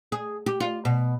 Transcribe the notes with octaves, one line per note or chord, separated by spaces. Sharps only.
G#4
G4
F4
B2